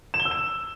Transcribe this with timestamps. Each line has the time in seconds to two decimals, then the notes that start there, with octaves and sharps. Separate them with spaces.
0.14 E7
0.20 G7
0.25 E6
0.31 E7